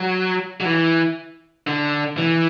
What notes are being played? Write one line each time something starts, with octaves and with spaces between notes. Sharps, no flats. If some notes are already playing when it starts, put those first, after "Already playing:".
Already playing: F#3
F#3
E3
D3
E3